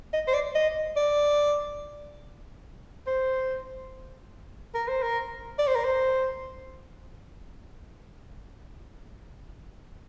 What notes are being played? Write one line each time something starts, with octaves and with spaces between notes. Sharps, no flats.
D#5
C5
D5
D#5
D5
C5
A#4
C5
A#4
D5
C5
A#4
C5